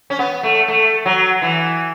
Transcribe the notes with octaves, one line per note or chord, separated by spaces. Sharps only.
C#4
B3
A3
A3
F#3
E3